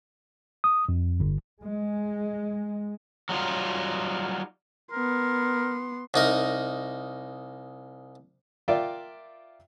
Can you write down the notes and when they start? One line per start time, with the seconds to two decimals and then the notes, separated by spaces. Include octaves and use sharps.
0.64 D#6
0.89 F2
1.20 G1
1.61 G#3
3.29 F#3 G3 D#4 F4
4.92 B3 A#4 C6
6.14 C2 D#4 A#4
8.68 F4 A#4 D5 E5 G5